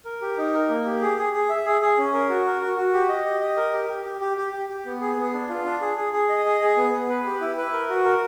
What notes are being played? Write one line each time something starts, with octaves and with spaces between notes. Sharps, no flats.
A#4
G4
D#4
A#4
A#3
G4
G#4
G#4
G#4
E5
G#4
G#4
C#4
A#4
F#4
A#4
F#4
F#4
G4
D#5
G4
D#5
A#4
G4
G4
G4
G4
G4
G4
G4
B3
G#4
B3
D4
F4
D4
G#4
G#4
G#4
D#5
G#4
G#4
B3
B3
B4
G4
E4
B4
A#4
F#4
A#4